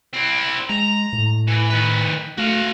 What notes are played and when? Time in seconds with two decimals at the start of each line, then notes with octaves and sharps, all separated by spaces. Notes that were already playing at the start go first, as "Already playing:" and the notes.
0.13 C4 E4
0.69 G#3 A#5
1.13 A2
1.47 E3
1.70 D#3 B4
2.38 A3 F#4 F5